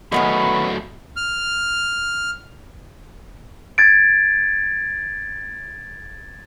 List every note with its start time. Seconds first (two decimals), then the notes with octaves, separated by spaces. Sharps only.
0.12 D#3 F#3 A3 B3 C#4 B5
1.17 F6
3.78 G#6 A6 D7